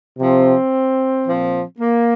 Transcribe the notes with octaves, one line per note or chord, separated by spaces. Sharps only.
C3 F3 C4
A#2 F3
A#3